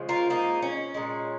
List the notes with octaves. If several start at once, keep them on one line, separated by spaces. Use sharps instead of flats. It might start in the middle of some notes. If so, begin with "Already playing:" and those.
Already playing: C#3 F3 G#3
F4 A#4
A#3 D#4
C#4
A#2 G#3